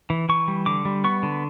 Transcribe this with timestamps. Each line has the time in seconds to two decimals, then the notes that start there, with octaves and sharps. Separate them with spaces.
0.10 E3
0.29 E3 C#6
0.48 G3
0.66 D3 D6
0.85 G3
1.04 B3 C#6
1.23 D3